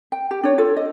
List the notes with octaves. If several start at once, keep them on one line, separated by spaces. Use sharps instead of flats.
G5
G4
D4 C#5
F4 A4
D#5